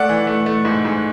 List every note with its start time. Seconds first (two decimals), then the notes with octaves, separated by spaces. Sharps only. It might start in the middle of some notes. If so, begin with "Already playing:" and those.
Already playing: A3 D5 F#5
0.09 E3
0.27 A3
0.46 A3
0.65 G#2
0.85 G#2